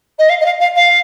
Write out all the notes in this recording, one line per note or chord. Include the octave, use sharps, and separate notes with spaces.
D#5
F5
D#5
F5
F5
F5